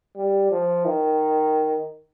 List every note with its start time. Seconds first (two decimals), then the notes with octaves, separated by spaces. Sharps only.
0.16 G3
0.51 F3
0.86 D#3